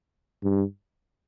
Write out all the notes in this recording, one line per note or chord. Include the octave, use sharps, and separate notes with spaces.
G2